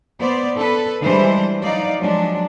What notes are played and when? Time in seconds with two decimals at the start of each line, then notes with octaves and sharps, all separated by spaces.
0.19 B3 C5 D5
0.56 A4 B4
1.00 E3 G3 G#3 D4 C5
1.61 F#3 D#4 D5 F5
1.98 F3 F#3 G#3 D4